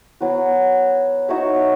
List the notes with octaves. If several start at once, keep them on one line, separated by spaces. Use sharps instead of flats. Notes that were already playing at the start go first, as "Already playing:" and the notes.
F#3 B3 F#4
D#4 F#4 C#5 E5